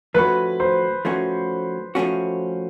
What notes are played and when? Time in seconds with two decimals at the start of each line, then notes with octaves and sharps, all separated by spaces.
0.14 F3 A3 C#4 F#4 B4
0.60 C5
1.05 F3 A3 C#4 F#4
1.95 F3 A3 C#4 F#4